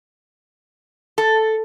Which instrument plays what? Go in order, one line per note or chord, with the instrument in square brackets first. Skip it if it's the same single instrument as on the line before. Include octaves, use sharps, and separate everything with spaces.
[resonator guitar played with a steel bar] A4